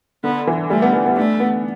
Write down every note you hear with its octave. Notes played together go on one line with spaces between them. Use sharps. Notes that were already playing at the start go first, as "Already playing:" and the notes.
D3 B3
E3
G3 A3
B3
B3
B3
A3 D4
B3